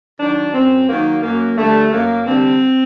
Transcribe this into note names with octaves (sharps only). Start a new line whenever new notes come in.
D#3 F#3 D4
F#2 C4
D#3 F#3 A#3
F#2 A#3
D3 G3 A3
F#2 A#3
D3 G3 C4